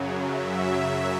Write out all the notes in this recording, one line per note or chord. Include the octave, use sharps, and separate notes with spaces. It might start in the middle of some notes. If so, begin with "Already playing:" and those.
Already playing: F#2 C#3 F#3
E5